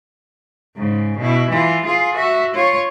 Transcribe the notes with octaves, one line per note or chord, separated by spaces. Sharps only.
G#2 C#3
B2 E4
E3 F4
F4 G#4
F#4 E5
F4 C#5